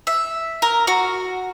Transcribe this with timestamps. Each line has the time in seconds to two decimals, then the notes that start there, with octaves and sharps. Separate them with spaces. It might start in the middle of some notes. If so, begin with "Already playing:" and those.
0.07 E5
0.62 A#4
0.87 F#4